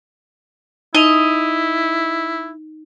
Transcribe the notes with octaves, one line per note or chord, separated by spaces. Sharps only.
D#4 E4 D#5 F7